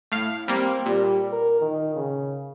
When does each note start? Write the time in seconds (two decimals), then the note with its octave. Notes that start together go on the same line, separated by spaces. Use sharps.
0.12 A2 F5
0.48 G3 A#3 C4
0.86 A#2 G3
1.33 A#4
1.61 D#3
1.95 C#3